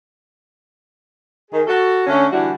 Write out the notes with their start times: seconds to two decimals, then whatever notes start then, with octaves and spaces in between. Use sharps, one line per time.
1.51 D#3 G#4
1.67 F#4 A4
2.07 D3 A3 C#4
2.32 D3 E3 G3 E4 F#4